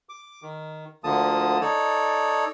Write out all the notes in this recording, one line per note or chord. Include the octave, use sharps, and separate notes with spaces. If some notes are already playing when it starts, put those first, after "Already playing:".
D6
D#3
D2 D3 F3 A#3 A5 D#6
D#4 A4 C#5 D5